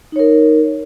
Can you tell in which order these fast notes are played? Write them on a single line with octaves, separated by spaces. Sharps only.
D#4 C#5 A#4